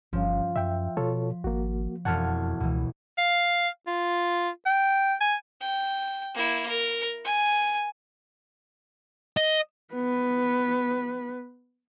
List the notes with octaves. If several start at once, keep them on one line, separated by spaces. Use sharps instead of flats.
G1 G2 F3 C#4
F#2 E5 G5
B2 F4 A4 C#5
G#1 A#3 F#4
E1 F2 C#5 F#5 A5 F6
C#2 B2 E3
F5
F4
G5
G#5
G5
A#3 E4
A#4
G#5
D#5
B3 B4